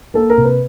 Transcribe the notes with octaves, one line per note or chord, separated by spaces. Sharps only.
A#3 A4
A#4
C3
B4